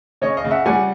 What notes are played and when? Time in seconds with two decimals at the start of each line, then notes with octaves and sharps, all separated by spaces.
0.21 C#3 C#5 D#5
0.37 D#5 F5
0.44 C#3
0.51 E5 F#5
0.66 G3 F#5 G#5